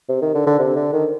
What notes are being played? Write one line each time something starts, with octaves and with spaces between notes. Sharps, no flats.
C3
D#3
D3
D3
C3
D3
D#3